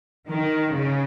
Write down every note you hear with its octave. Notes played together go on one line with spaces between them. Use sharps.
D#3
C#3